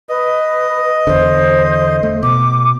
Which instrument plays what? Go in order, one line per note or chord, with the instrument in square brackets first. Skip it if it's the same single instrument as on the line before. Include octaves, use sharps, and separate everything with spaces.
[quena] B4 [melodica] D#5
[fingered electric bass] E2 D3 [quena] C5
[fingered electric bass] A3
[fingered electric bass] B2 [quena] D6